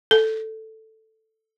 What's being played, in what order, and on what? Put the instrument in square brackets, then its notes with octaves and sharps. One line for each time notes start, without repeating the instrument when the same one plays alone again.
[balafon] A4